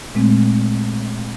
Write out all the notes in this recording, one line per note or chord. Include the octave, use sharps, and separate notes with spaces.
A#2 G#3 A3 C4